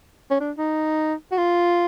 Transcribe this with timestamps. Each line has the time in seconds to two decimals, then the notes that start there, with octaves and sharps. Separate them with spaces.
0.31 C#4
0.40 D4
0.58 D#4
1.32 F#4
1.38 F4